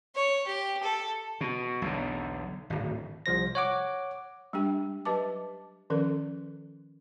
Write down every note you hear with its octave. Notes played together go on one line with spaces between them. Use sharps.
C#5
G4
A4
B2
B1 E2 D3
D1 G#1
C2 F3 C5 A#6
C#5 F#5 D6
G3 G#3 D4 G4 G5
F#3 G4 B4 E5 A5 D6
D#3 F3 C#4 A4 A#4